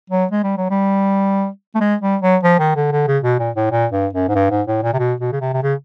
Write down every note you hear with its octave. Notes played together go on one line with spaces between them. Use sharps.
F#3
G#3
G3
F#3
G3
A3
G#3
G3
F#3
F3
D#3
D3
D3
C#3
B2
A#2
A2
A#2
G2
F#2
G#2
G2
G#2
A2
A#2
C3
B2
B2
C#3
C3
C3
C#3